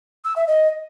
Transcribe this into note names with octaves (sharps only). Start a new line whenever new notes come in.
E6
E5
D#5